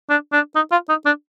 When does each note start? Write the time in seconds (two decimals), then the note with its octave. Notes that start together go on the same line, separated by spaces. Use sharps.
0.09 D4
0.32 D4
0.55 D#4
0.72 F4
0.89 D#4
1.06 D4